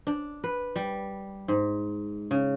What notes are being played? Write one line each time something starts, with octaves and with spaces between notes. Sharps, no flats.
D4
B4
G3
G#2
C#3